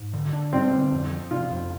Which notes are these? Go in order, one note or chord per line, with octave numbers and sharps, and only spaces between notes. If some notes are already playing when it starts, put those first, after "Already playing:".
Already playing: G#2
D3
D4
G3 C4
D3
F2
F3
C3 F4
F2